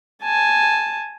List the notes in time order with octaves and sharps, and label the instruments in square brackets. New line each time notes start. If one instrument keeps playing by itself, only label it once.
[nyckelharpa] G#5 A5